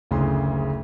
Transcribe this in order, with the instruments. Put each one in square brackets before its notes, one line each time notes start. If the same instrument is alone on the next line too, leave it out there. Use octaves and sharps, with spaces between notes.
[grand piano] F#1 D2 C#3 G#4 C6